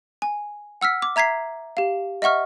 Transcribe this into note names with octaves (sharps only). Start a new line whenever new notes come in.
G#5
F#5 E6 F6 B6
D6
E5 A#5 G#6 B6 C7
G4 F5
D#5 E5 F#5 C#6 F6